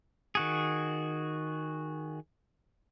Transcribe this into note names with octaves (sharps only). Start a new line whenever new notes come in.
D#3 F#4 G#4